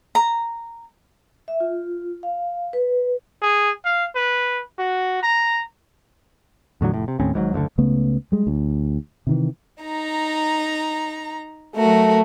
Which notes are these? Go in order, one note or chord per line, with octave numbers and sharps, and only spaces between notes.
A#5
E5
F4
F5
B4
G#4
F5
B4
F#4
A#5
E2 A2 D3 F#3
F1 A2
C3
D#2 A2 C4 C#4
G#1 G#2 C3 F#3
F#1 D2 B2 D3
C#2 C#3 A3 B3
G3 G#3
D2
C3 D#3 E3
D#4 A#5
F#3 A3 F#4 A#4